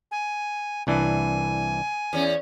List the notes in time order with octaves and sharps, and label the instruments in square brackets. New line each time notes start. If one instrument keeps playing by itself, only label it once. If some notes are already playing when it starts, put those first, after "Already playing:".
[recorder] G#5
[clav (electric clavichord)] C2 E3 D4 [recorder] G#5
[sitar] E2 C#4